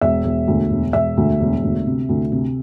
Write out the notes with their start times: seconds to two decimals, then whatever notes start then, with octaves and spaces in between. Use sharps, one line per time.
0.01 E1 E5
0.25 E1
0.48 D2
0.70 E1
0.93 E1 E5
1.17 D2
1.40 E1
1.63 D2
1.86 C3
2.09 D2
2.32 C3